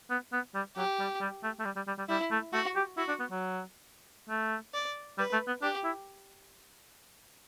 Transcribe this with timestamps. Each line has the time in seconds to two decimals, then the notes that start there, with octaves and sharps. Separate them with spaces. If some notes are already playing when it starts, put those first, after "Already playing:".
0.10 B3
0.33 B3
0.54 G3
0.77 F#3 G4
0.99 G3
1.21 G3
1.43 A3
1.59 A3
1.65 G3
1.76 G3
1.87 G3
1.98 G3
2.09 G3 E4
2.31 A3
2.53 A3 F#4
2.76 G4
2.97 E4 F#4
3.08 D4
3.20 B3
3.31 F#3
4.29 A3
4.74 D5
5.18 G3 B4
5.33 A3
5.47 B3
5.62 D4 G4
5.84 E4